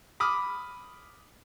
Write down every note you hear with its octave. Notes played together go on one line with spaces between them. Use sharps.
B5 D6 D#6 F6